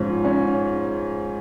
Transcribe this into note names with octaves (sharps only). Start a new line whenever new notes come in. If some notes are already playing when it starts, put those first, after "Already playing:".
Already playing: G#2 F3 C#4
C#4